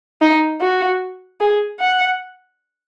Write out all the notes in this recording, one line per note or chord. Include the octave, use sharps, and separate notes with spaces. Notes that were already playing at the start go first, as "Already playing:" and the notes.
D#4
F#4
G#4
F#5